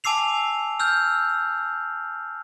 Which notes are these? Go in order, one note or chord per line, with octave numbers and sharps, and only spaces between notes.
G#5 A5 D6 E6 C7 F7
E6 F6 G6